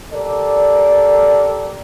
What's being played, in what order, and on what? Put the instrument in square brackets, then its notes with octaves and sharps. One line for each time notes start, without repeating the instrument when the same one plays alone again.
[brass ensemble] G4 A4 A#4 D5